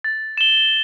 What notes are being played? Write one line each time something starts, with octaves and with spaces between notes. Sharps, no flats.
A6
E7 G7